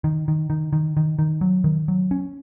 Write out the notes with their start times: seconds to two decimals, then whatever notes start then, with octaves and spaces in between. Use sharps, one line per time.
0.04 D#3
0.28 D#3
0.50 D#3
0.73 D#3
0.97 D#3
1.19 D#3
1.41 F#3
1.64 D#3
1.88 F#3
2.11 C#4